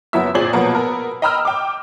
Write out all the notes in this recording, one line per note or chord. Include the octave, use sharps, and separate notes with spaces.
F#1 F#3 B3 E4 E5 E6
G1 A#2 C4 G#4 D5 F#7
B2 F3 F#3 A#3 B3
B3 A#4
D#5 G5 A#5 B5 E6 F6
G5 D6